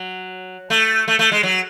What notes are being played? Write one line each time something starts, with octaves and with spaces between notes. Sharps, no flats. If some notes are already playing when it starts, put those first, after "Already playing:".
Already playing: F#3
A3
A3
A3
G#3
F#3